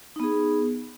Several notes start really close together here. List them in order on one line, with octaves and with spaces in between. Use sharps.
D#4 B3 G#4